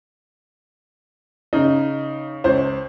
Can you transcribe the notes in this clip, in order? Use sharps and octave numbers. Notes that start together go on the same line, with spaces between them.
C#3 D#4
C#2 C5 C#5